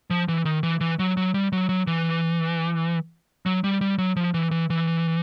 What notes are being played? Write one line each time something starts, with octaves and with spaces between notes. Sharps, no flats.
F3
E3
D#3
E3
E3
F#3
F#3
G3
F#3
F#3
E3
F#3
G3
G3
F#3
F3
E3
E3
E3